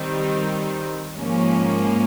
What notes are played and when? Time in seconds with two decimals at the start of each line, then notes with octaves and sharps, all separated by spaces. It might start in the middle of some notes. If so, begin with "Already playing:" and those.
Already playing: D#3 G3 C4 D#4
1.16 G#2 F3 A#3 C#4